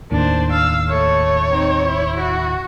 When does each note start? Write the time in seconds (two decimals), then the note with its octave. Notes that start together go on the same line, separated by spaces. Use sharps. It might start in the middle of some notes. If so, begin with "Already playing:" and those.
0.11 D#2 A2 D#3 D4 C5
0.52 F5 E6
0.89 A3 C#5
1.50 C4 D#4
1.86 E4
2.18 F#4